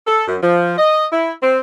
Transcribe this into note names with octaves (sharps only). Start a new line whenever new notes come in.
A4
F#2
F3
D#5
E4
C4